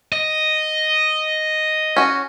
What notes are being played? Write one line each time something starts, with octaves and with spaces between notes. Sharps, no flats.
D#5
C#4 F#4